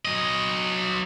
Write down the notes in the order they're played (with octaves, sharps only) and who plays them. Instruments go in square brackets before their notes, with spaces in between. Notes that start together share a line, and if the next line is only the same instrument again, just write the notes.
[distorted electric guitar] F#3 D#5